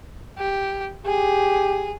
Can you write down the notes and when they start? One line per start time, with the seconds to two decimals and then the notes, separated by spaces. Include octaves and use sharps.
0.38 G4
1.06 G4 G#4